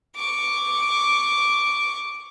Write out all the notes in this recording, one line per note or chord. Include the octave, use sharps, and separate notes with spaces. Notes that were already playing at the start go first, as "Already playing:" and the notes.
C#6 D6